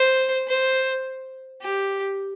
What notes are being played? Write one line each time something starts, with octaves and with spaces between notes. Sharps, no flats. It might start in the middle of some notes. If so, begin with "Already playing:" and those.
Already playing: C5
C5
G4